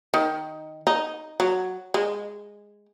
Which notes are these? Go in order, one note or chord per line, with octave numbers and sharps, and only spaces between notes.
D#3
D#4
F#3
G#3